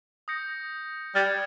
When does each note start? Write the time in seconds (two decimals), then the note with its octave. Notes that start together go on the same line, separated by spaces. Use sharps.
0.28 D#6 G6 A#6 C#7
1.15 G3 F6 G#6 C#7